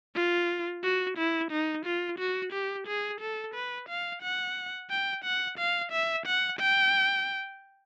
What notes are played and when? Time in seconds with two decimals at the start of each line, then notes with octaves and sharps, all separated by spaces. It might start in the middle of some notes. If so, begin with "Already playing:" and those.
0.15 F4
0.83 F#4
1.18 E4
1.51 D#4
1.86 F4
2.19 F#4
2.53 G4
2.87 G#4
3.21 A4
3.55 B4
3.89 F5
4.23 F#5
4.90 G5
5.24 F#5
5.58 F5
5.92 E5
6.26 F#5
6.60 G5